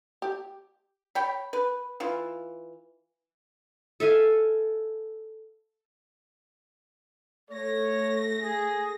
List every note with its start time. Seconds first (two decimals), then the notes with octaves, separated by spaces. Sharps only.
0.22 G4
1.15 C#5 G5 B5
1.53 B4
2.00 E3 F4
4.00 A4 E5 F5 G#5
7.50 A3 C#5 A#6
8.42 G#4